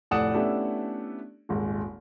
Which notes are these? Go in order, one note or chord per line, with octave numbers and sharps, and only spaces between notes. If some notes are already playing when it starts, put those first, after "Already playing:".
F1 A2 D5 F#5 D#6 E7
A3 B3 C#4 D4 E4 G4
D#1 G#1 G#3